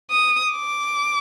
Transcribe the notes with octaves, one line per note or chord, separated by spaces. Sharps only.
D#6
D6